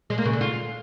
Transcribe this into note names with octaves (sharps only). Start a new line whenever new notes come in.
G#3
A#3
C#3
D3
F4